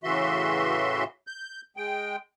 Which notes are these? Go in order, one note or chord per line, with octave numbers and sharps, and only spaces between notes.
A2 C#3 E3 F#4 E5 C6
G6
G#3 G5